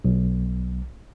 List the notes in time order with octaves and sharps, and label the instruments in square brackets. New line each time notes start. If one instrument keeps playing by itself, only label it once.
[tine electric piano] B1